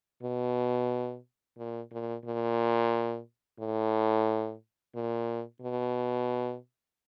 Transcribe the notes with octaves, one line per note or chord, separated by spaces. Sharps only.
B2
A#2
A#2
A#2
A2
A#2
B2